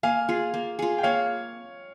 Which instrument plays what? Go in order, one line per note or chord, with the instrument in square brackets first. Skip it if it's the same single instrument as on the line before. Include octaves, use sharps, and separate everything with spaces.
[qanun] A#3 [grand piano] F5 G#5
[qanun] F4 G#4
A#3
F4 G#4
[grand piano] G5
[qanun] A#3 [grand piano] C#5 F5